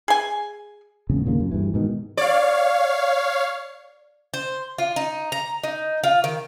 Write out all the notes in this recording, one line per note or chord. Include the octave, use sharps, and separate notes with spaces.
G#4 G#5
E1 A#1 C#3
D#2 A#2 C#3 A#3
F#2
D2 G2 E3
G#2 B2 D#3
C#5 D5 F5
C5
F4
D#4
A#5
D#4
F4
D#3